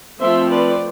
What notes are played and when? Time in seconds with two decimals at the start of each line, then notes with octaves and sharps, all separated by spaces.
0.19 F3 A3 C4 C5 E5
0.49 B4 D5